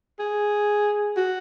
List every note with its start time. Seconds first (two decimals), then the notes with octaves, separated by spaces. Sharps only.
0.19 G#4
1.17 F#4